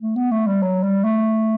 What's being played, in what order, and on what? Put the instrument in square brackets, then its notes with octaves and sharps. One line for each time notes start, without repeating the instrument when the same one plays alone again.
[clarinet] A3
B3
A3
G3
F#3
G3
A3